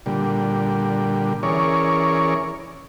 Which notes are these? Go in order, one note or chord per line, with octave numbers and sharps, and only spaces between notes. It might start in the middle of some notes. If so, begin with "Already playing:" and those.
A#2 D3 G3
E3 C#4 G#4 A#4 C#5 D5